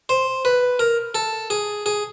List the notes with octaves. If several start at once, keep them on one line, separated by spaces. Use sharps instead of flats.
C5
B4
A#4
A4
G#4
G#4